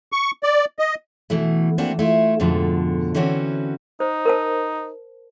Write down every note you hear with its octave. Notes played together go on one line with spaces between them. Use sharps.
C#6
D5
D#5
B2 E3 A3
E3 A#3 C4 D4 F#4
A3 E4 F4
F2 G#2 B2 D3 F3
D3 E3 C4 C#4 F#4 B4
D#4 C5
A#4 C5 A5